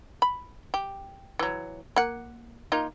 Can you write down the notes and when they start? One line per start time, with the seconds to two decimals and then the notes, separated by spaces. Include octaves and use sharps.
0.22 B5
0.74 G4
1.39 E3 F#3
1.96 A#3 F#5
2.72 A#3 D#4 F4